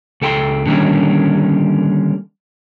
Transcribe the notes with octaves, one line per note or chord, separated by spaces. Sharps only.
C#2 A4 G5 B5 C6
D3 D#3 G3 A#3 C#4